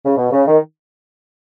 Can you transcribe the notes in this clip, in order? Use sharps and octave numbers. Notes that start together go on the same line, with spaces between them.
C#3
B2
C#3
D#3